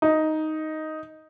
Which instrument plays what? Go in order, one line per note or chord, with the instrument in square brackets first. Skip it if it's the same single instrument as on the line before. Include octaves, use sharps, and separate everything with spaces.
[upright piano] D#4